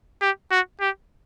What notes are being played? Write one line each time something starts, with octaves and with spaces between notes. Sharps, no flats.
G4
F#4
G4